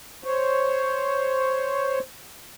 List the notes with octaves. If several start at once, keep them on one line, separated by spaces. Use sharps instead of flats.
C5 C#5